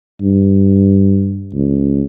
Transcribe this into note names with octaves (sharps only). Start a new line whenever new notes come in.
G2
C#2